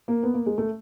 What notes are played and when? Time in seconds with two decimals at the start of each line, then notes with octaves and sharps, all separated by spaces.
0.08 A#3
0.23 B3
0.34 A#3
0.46 G#3
0.58 A3